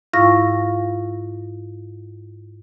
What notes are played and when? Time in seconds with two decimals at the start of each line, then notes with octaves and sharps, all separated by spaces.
0.13 G#2 E4 F4 F5 C#6 A#6